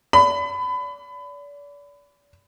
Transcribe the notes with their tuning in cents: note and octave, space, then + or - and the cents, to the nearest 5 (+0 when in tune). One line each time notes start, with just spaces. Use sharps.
D5 -35 B5 +25